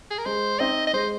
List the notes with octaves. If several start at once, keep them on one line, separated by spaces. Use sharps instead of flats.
G#4
A#4
G#3 C5
C4 D#4 D#5
D#5
G#3 C5